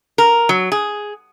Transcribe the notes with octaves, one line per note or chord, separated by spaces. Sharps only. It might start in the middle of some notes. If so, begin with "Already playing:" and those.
A#4
F#3
G#4